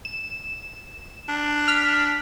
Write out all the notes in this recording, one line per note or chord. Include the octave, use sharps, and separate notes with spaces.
E7
D4
F6 B6